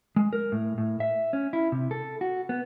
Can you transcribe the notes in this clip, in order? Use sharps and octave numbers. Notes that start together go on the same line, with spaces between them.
G#3
A#4
A2
A2
E5
C#4
E4
C3
A4
F#4
B3